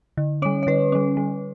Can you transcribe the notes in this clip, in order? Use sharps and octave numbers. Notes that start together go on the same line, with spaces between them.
D3
G3 C#4 C#5
C#5
D3 B4
G3 C#4
G3